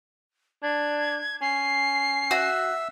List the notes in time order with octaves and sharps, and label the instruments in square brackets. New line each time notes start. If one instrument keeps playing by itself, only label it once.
[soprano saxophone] D4 [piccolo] G#6
[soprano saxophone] C#4 [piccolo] C7
[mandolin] F#4 [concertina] E5 E6